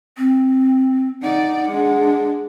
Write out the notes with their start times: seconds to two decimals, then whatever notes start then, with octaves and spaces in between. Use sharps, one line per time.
0.17 C4
1.23 D#4 D5 F#5
1.69 G#3 D4